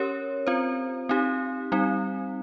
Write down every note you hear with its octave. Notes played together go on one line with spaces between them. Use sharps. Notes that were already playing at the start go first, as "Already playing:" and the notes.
Already playing: C#4 G4 A#4 C#5
C4 F4 C5
C4 D#4 G4
G3 C4 D#4